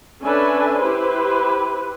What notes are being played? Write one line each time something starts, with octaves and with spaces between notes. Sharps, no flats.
C#4 D4 A4 B4 E5 G#5
E4 G4 B4 C5